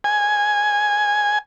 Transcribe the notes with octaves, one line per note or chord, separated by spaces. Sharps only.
G#5